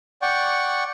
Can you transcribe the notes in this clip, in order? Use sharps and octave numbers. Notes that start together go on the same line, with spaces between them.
D5 F#5 G5 C#6